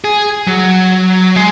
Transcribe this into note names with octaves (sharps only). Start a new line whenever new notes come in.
G#4
F#3
G#3